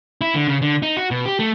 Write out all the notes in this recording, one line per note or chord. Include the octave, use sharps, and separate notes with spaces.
E4
D3
C#3
D3
D#4
F#4
B2
G4
A3